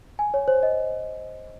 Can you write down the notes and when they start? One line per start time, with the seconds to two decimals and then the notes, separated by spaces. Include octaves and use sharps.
0.19 G#5
0.34 C#5
0.48 C5
0.63 D#5